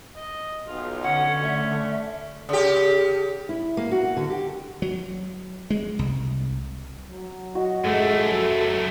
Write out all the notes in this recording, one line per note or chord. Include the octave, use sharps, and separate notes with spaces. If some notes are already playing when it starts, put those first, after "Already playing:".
D#5
B1 F4
D3 C#4 F#5
A3 D5 E5
C#3 G4
E4
A#3
F#4
D3
G4
F#3
G#3
C2
F#3
F#4 D#5
A1 F#2 F3 G#3 A3 A4
F#3